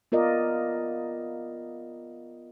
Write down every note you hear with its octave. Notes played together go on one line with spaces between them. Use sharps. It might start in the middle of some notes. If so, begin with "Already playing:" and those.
B3 F4 A#4 D5 D#5